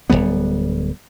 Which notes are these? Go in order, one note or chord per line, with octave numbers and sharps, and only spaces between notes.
D1 G#2 G3 B3